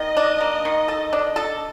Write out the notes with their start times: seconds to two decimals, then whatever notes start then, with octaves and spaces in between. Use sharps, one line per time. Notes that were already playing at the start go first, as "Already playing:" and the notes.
Already playing: D#3 D#5
0.17 D4
0.41 A#3
0.65 D#3
0.88 A4
1.13 D4
1.36 A4